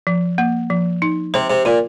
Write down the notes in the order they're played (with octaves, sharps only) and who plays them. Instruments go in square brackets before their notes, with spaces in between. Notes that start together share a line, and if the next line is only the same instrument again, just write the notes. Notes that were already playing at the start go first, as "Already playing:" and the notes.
[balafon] F3
A#3
F3
D#4
[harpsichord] C3 [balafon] C5
[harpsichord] C3
[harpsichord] A#2 [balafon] F4